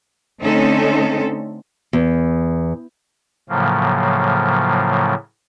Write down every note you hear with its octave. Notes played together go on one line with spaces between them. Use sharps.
D3 A3 C4 C#4 D#4 A4
E2
A2 C#3 F3 F#3 A#3